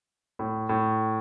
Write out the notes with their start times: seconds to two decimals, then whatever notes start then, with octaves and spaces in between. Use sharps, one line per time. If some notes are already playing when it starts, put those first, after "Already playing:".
0.39 A2
0.69 A2